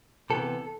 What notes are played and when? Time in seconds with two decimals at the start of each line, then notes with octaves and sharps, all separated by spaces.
0.30 C3 E3 B3 A4